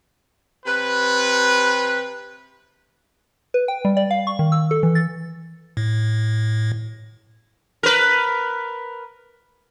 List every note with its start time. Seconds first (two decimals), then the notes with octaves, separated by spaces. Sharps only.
0.66 C3 B4
3.54 B4
3.68 G5
3.85 G3
3.97 D5
4.11 F5
4.27 C#6
4.39 D#3
4.52 E6
4.71 A4
4.83 E3
4.95 A6
5.77 A2
7.83 A#4 B4